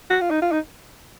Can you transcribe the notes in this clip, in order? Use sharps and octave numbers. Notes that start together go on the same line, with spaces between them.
F#4
F4
D#4
F4
D#4